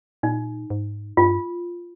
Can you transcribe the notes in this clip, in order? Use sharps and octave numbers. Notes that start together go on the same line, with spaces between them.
A#2 D#4
G#2
G2 F4